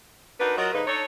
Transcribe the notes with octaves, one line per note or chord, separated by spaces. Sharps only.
D4 D#4 F#4 A#4 B4
F#3 F4 F#4 A#4 C#5 D#5
G#2 D3 A#3 D#4 B4
D4 D#4 A4 C#5